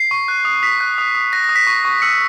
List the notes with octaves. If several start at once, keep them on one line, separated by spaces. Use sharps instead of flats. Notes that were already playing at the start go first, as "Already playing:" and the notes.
Already playing: C7
C#6
F#6
D#6
D#6 B6
F#6
D#6
D#6
F#6 A#6
D#6 A#6
B6
C#6
C#6
E6 C#7